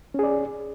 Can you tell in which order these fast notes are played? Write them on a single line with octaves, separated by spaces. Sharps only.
C#4 G#4 D5